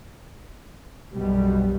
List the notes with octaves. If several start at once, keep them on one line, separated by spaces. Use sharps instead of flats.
B1 F#2 B2 G3